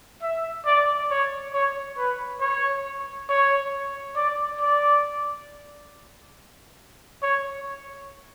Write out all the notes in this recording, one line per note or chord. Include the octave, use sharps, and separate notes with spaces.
E5
D5
C#5
C#5
B4
C#5
C#5
D5
D5
C#5